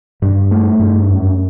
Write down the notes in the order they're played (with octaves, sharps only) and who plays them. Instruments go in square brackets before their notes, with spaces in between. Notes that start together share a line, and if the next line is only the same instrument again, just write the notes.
[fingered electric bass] G2
A3
G2
F#2